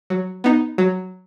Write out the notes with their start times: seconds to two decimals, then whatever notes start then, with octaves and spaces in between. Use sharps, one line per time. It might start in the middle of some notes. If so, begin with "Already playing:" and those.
0.10 F#3
0.44 B3 D#4
0.78 F#3